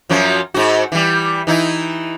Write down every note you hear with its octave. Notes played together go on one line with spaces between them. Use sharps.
F#2 F3 F#3
G#2 F#4
E3 G3
E3 D#4 E4